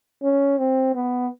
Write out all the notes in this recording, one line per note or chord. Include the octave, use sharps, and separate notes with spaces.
C#4
C4
B3